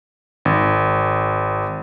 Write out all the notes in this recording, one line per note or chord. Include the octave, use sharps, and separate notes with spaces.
G#1